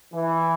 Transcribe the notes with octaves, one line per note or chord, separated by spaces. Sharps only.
E3